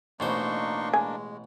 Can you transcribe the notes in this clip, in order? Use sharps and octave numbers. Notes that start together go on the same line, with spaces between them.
A1 B2 A#3 D4 D#4 C5 C6 C#6
G#3 G#5